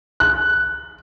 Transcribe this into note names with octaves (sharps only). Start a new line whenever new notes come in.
F#6